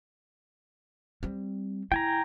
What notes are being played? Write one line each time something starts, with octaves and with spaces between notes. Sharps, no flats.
G3 C4
E4 G5 G#5 A#5